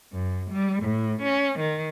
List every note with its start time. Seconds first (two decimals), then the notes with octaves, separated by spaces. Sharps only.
0.13 F#2
0.51 G3
0.84 A2
1.22 C#4
1.60 D#3